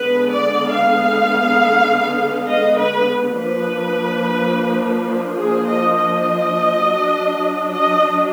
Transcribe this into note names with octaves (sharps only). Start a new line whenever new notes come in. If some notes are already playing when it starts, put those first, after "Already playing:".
Already playing: D3 G#3 B3 B4
D5
F5
D#5
B4
F3 A#3 D4 B4
G#4
D#5
D#5
F#3 D4
D#5